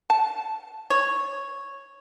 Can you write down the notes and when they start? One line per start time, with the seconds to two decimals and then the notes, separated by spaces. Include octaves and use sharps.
0.10 A5
0.90 C#5